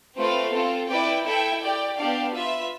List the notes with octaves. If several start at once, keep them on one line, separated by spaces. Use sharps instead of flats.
A3 C4 F4 B4 F5
C4 F4 A4
E4 B4 D5 G5
E4 A4 E5 G5
G4 D5 G5
B3 D4 G4 D5 F5
F4 B4 E5